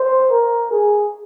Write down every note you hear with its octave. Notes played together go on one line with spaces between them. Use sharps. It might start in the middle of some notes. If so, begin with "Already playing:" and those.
Already playing: C5
A#4
G#4